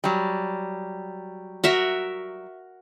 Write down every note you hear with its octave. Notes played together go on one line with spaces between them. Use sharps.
F#3 G3
F#4 A#4 E5